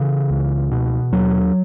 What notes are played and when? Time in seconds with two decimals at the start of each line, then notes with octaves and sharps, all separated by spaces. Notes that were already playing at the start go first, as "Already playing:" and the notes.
Already playing: C#3 E3
0.30 C#2
0.71 B2
1.12 D#2 F#3